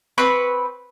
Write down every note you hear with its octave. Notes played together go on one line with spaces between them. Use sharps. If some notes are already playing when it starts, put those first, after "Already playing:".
C4 B4 B5 C#6